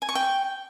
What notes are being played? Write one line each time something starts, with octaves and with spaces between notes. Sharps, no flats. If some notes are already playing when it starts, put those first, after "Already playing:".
G#5
C#6
G5